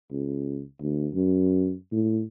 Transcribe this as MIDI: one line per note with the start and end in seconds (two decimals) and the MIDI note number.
0.12 0.62 37
0.81 1.09 38
1.15 1.73 42
1.92 2.22 45